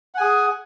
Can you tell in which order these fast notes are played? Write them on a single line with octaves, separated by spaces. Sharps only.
F#5 G#5 G#4